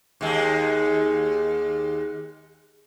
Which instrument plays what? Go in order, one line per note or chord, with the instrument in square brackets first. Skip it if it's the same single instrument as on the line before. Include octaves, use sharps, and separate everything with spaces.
[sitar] D#2 G#3